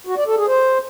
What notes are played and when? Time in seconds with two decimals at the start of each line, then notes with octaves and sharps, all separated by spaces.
0.07 F#4
0.17 D5
0.27 A4
0.37 G#4
0.47 C5